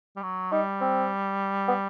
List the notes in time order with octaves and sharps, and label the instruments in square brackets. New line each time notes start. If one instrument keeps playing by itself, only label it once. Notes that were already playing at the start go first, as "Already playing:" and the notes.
[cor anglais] G3
F#3
[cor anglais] G3 [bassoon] D#4
[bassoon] C4
B3